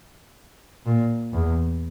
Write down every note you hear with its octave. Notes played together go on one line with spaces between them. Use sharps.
A#2
E2